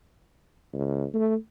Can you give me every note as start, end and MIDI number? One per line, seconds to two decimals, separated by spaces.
0.73 1.05 37
1.14 1.35 57